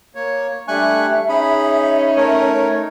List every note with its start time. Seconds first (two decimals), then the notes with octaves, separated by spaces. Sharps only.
0.15 A#3 C#5
0.68 G3 A3 D4 E5 G#5 C#6 F#6
1.29 C#4 D#4 G#4 B5
2.17 A3 A#4 C#5